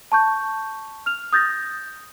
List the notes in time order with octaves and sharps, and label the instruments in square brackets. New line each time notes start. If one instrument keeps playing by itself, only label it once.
[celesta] A5 C#6 G6
F6 F7
D#6 G6 A6 A#6